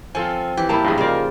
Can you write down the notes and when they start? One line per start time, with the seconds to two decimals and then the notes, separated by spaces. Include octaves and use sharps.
0.15 F3 C4 F4 A4 G#5
0.57 E3 G4
0.69 A#2 F3 A#3 E4 A5
0.84 A1 G2 F4 G#4
0.98 C#3 D#4 F4 A#4 C5 D5